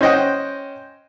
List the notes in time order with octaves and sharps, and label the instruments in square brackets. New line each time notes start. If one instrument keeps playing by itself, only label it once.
[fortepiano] C#4 C5 D#5 F#5 G5